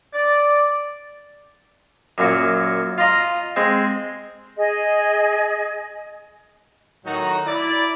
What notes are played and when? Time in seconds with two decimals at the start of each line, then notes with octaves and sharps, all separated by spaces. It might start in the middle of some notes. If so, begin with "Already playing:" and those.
0.13 D5
2.18 F#2 A#2 F#3
2.98 F4 D#5 A#5
3.56 G#3 C4
4.56 G#4 D#5
7.06 A2 D#3 F#3 D#4 F#4 A#5
7.46 E4 D5